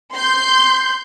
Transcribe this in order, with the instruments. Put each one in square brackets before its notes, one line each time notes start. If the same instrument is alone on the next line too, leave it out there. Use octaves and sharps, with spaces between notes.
[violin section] C6 G6